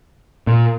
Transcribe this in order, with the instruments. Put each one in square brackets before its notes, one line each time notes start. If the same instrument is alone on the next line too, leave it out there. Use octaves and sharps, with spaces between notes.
[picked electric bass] A#2